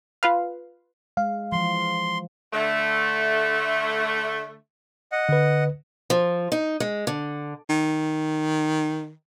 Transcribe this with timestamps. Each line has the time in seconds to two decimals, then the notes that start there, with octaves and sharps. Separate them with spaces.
0.23 F4 B4 F5
1.17 G#3 F5
1.52 E3 F3 C6
2.53 D3 A3
5.12 D#5 F#5
5.29 D3 B4
6.10 F3
6.52 D#4
6.80 G#3
7.07 D3
7.70 D#3